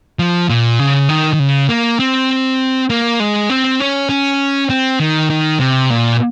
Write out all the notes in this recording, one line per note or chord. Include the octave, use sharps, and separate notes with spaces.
F3
A#2
C#3
D#3
D#3
C#3
A#3
C4
A#3
G#3
C4
C#4
C#4
C4
D#3
D#3
C3
A#2